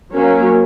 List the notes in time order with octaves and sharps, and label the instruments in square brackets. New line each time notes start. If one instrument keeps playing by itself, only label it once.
[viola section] F#3 A#3 C#4